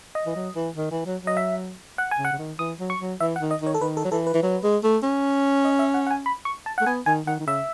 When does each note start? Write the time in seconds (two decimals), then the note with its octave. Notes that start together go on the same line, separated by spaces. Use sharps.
0.15 D#5
0.26 E3
0.35 F#3
0.55 E3
0.76 D#3
0.91 E3
1.06 F#3
1.22 F#3
1.27 D#5
1.37 E5
1.98 F#5
2.11 G#5
2.19 C#3
2.25 F#5
2.32 C#3
2.38 D#3
2.59 E3 D#6
2.80 F#3
2.90 C#6
3.00 F#3
3.20 E3 E5
3.36 F#5
3.40 D#3
3.51 D#5
3.61 D#3
3.67 C#5
3.74 A4
3.81 D#3 B4
3.97 A4
4.05 F#3
4.11 E3 A4
4.27 B4
4.34 E3
4.43 F#3
4.63 G#3
4.83 A3
5.03 C#4
5.65 D#5
5.79 E5
5.94 F#5
6.07 F#5
6.11 G#5
6.26 B5
6.45 C#6
6.66 A5
6.78 A3 F#5
6.86 B3 G#5
7.06 D#3 G#5
7.27 D#3 F#5
7.40 D#3
7.47 C#3 E5